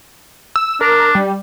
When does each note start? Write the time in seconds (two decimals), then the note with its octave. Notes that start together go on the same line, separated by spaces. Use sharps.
0.56 E6
0.81 D4 A#4
1.15 G3